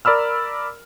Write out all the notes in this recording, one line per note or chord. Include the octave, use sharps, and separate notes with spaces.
A#4 D5 B5 E6 F6